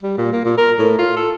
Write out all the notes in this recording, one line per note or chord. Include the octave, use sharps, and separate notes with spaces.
G3
A#2
A#3
A#2
A#4
A2
F4
A4